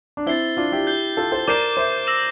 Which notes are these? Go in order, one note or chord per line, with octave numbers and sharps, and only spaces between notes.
D4
C4 E4 A6 C7 G7
D4 F4
E4 G4
G6 C7 G7
F4 A4
A4 C5
A#4 D5 D6 G6 C7 E7
C5 E5
E6 A#6 E7